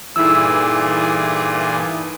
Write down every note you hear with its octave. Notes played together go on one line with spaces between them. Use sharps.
G2 A#2 E3 D#4 E4 G#4 A4 E6